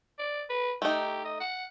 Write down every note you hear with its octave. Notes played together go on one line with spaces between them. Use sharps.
D5
B4
A3 D#4 G4
D#5
F#5